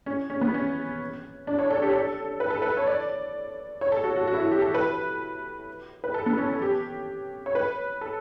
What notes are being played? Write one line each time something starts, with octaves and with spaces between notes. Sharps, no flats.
C#4
C#4
B3
C#4
D4
C#5
A4
G4
A4
B4
A4
B4
C#5
D5
C#5
A4
F#4
F#4
F#4
E4
F#4
G4
A4
B4
B4
A4
B3
C#4
A4
G4
C#5
B4
A4